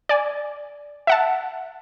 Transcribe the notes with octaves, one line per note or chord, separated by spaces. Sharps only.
D5 G#5
E5 F#5 A5